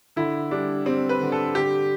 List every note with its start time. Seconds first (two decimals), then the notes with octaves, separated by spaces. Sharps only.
0.16 D3 E4
0.51 G3 D4
0.85 G3 C4
1.09 B4
1.21 D3
1.32 A4
1.55 D3 G4